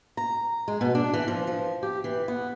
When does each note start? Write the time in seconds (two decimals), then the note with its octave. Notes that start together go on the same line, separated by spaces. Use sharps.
0.17 A#5
0.68 G#3
0.81 B2
0.95 D4
1.13 E3
1.28 F3
1.47 F3
1.83 G4
2.04 E3
2.28 B3